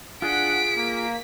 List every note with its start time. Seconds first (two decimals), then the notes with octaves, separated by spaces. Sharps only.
0.22 D4 F4 G#4 D#5 F#5 B6 D7
0.77 A#3